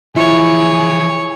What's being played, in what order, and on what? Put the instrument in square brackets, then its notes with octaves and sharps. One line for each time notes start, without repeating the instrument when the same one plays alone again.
[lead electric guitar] E3 F3 [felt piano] E4 F4 [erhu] G#4 [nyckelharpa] C#5